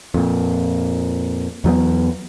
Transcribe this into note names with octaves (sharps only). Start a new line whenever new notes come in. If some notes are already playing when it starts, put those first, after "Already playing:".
F2 A#2
E2 F#3 G3 B3